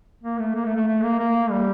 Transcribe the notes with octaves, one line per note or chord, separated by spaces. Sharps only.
A#3
A3
A#3
A3
A3
A3
A#3
A#3
G3